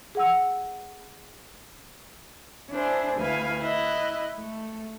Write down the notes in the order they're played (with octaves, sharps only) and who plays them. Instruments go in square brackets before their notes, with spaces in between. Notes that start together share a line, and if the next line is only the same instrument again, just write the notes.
[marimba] G#4 F#5 E6
[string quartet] D4 E4 G#4 C5
D2 E4 B4 F5 G#5
E4 D#5 F#6
A3